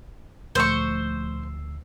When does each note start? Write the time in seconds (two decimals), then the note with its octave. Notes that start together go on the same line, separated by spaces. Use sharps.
0.55 D2 A#2 F3 A3 C5 C#6 E6 C7